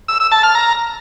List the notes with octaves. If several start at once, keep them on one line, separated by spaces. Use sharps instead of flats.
E6
E6
A5
F6
A#5